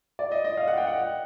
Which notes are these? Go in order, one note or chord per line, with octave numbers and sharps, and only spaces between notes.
D5
D#5
D#5
F5
F#5
G5
F#5